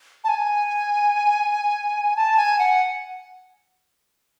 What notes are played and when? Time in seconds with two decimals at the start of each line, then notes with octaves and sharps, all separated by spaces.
0.24 A5
0.28 G#5
2.17 A5
2.37 G#5
2.59 F#5